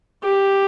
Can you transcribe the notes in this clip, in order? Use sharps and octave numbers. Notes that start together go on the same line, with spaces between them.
G4